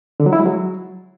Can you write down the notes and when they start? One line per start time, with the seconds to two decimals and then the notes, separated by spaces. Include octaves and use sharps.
0.20 D3
0.26 F#3
0.33 E4
0.39 G#3
0.46 F#3